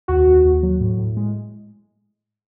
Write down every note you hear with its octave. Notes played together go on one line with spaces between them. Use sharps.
D#2 F#4
D#2
D#2
F#3
A2
A2
G#3